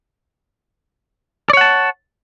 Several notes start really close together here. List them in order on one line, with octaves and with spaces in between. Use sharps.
D5 C#5 F#5 A5